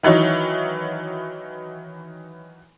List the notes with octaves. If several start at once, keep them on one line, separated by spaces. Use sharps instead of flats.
D#3 E3 F#3 D#4 C#5